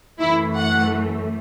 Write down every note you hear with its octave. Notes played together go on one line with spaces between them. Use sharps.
F#2 E3 A3 E4
F#5